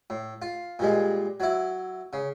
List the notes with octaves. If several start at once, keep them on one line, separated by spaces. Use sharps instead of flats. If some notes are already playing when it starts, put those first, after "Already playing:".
A2
F4
A#2 G3 G#3
F#3 E4
C#3